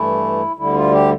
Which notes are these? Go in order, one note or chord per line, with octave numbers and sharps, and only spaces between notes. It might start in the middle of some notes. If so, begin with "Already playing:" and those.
Already playing: G2 E3 A3 E4
D2 D3 G3 E4
F4
G4